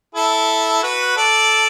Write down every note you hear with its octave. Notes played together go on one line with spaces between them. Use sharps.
E4 A4
F#4 B4
A4 D5